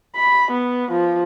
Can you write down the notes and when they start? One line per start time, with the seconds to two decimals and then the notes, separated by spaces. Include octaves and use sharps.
0.16 B5
0.51 B3
0.92 F3